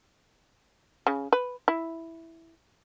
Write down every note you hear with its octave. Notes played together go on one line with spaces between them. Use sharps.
C#3
B4
E4